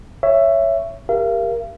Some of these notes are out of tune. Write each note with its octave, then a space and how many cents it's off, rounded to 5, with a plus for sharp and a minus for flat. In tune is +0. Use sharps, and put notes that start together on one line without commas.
C#5 +0 E5 +15 C#6 +0
G4 +20 A#4 +5 F5 -45